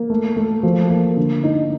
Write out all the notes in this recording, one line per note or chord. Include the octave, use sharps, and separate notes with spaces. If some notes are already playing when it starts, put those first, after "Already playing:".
Already playing: A#3
A3
A3
F3
A#3
D3
D#4